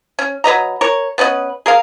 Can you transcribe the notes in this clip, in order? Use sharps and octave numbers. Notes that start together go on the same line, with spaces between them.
C#4
F#3 B4 D#5 A#5
A#4 C#5
B3 C#4 B4 D#5
G#4 A#4 F5